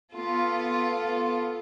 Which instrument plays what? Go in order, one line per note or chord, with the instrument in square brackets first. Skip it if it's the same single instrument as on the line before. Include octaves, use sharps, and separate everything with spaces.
[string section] B3 F4 A4